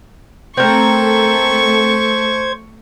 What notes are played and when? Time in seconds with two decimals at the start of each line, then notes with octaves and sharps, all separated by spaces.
0.57 A3 C4 A4 A#4 C5 C#6 G#6